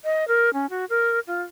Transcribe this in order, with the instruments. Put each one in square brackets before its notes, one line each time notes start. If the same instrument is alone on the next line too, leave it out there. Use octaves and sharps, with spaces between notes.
[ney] D#5
A#4
C#4
F#4
A#4
F4